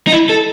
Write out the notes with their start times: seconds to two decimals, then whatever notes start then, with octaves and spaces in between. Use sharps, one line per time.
0.07 D#4
0.12 E4
0.30 A4